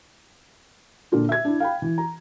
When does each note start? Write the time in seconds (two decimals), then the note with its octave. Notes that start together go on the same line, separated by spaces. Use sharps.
1.12 A#2 D3 D4 F4 A4
1.29 E5 G#6
1.45 D4 E4
1.60 F5 G5 B5
1.82 E3
1.98 A#5